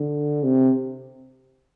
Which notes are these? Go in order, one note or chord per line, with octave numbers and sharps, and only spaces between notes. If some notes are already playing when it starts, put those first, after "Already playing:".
Already playing: D3
C3